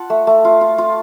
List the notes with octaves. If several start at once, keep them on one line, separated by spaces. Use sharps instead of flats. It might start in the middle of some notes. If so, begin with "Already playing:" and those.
Already playing: F4 F#5 A5
A3
A3
F4
F4
F4